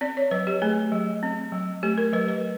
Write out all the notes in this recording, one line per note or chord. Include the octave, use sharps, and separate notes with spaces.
C4 D5
C#5
F#3 B4
G4
A3 G#4
F#3
C4
F#3
A3 G4
A#4
F#3 B4
B4